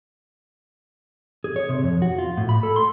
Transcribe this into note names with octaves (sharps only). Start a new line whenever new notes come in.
G#4
C#5
C3
F2
F#4
F4
A2
B5
A4
C6